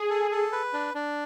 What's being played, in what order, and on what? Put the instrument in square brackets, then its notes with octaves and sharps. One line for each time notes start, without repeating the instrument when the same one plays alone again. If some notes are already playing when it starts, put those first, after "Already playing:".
Already playing: [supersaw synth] G#4
[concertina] A4
A4
B4
D4
D4